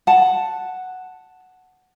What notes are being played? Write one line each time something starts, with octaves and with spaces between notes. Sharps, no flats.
F#5 A5